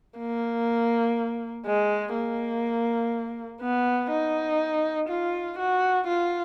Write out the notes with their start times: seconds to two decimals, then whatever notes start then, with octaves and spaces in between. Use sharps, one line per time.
0.19 A#3
1.66 G#3
2.14 A#3
3.61 B3
4.11 D#4
5.08 F4
5.58 F#4
6.07 F4